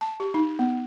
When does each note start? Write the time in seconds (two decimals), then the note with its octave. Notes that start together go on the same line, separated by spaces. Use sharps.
0.01 A5
0.20 G4
0.34 D#4
0.59 B3